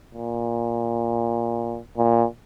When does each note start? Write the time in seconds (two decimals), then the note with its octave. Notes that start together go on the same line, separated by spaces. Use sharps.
0.15 A#2
1.97 A#2